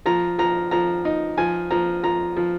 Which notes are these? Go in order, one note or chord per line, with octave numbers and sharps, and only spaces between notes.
F3 A#5
F3 A#5
F3 A#5
D#4
F3 G#5
F3 A#5
F3 A#5
F3